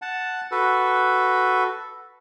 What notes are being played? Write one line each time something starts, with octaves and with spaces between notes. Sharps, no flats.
F#5 A5
F#4 A4 B4